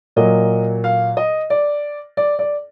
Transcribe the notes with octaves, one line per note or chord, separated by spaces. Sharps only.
A#2 F#3 A#3 D#5
F5
D#5
D5
D5
D5